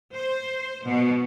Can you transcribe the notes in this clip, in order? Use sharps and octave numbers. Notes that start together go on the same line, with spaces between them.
C5
B2